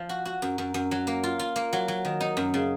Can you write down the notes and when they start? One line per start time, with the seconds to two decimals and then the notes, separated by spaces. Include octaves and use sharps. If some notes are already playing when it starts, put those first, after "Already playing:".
Already playing: F3
0.09 F#4
0.25 F#4
0.42 F#2
0.58 F#2
0.74 F#2
0.91 F#3
1.07 A#3
1.24 F4
1.39 F4
1.56 A#3
1.73 F#3
1.88 F#3
2.05 D#3
2.20 D#4
2.37 F#2
2.54 C#3